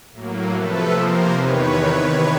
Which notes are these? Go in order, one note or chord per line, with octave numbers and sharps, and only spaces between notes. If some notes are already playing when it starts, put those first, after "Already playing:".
A2 F#3 A#3
C3 F3 A3 A4 B4
C3 F3 A#3 A#4 C5
E2 C3 D#3 B4 C#5